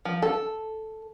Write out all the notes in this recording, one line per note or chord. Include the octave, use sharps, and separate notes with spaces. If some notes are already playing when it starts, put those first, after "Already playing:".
F3
A4